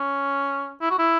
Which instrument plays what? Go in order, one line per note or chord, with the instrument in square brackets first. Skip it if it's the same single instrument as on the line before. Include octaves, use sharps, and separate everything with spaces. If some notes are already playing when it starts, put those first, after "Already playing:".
Already playing: [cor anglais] C#4
E4
F#4
E4